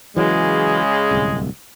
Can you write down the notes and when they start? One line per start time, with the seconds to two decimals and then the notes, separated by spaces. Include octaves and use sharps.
0.16 C#3 E3 F#3 G#3
1.11 D1 C2